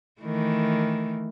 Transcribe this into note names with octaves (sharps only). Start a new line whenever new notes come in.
D#3 E3 A3